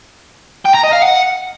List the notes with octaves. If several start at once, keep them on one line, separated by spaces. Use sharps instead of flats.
G5
A#5
D#5
F5
F#5